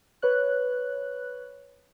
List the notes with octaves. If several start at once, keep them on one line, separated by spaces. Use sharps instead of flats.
B4 C#5 F#6